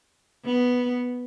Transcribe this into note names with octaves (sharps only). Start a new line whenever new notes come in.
B3